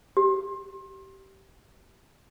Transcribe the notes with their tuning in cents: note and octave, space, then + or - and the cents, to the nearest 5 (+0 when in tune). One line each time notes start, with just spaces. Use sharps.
G4 -25